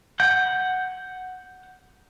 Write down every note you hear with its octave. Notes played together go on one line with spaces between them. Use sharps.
F#5 G6